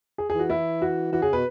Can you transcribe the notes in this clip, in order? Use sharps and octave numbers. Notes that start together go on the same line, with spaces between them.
G#4
E3 G#4
F#4
E4
F#4
E3 F#4
C#3 G#4
B2 B4